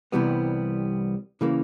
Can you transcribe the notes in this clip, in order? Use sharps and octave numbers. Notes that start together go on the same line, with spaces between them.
C2 C3 E3 G3 B3
C#3 E3 G3 A#3